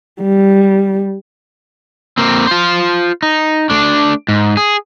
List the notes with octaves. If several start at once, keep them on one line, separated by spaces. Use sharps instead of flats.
G3
A#3 C4
F4 C5
D#4
A3 D4
G#2
G#4